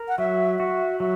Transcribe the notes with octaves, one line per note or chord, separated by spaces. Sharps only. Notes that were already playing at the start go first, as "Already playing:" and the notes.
Already playing: A#4
F#5
F#3 E5
F#4 E5
F#3 E5